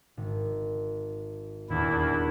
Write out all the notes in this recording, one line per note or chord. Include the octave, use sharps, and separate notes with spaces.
G#1
D#1 E2 D4 E4